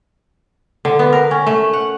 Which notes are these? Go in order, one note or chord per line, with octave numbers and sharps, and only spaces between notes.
D3
B3
A#4
C#4
A3
F#5